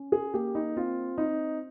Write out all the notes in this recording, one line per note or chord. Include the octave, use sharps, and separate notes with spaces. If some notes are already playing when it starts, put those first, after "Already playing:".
Already playing: C#4
G#4
A#3 G4
D#4
C4 F4
C4 D#4